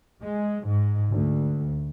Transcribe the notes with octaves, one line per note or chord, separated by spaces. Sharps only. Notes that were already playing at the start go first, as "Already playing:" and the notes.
G#3
G#2
D2